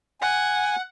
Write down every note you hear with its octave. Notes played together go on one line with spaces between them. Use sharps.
F#5 G#5